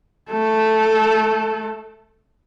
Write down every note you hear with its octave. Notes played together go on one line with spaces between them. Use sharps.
A3 A4